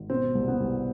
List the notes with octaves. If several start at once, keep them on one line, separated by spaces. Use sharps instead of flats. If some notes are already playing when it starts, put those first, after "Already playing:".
Already playing: G#1
B2 C4
C2
B3
C2